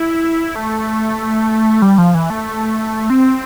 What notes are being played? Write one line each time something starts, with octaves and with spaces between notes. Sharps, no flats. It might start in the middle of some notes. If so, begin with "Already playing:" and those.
Already playing: E4
A3
G3
F3
E3
A3
C4